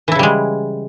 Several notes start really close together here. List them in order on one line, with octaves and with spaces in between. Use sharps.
E3 E4 C#3 G3 G#3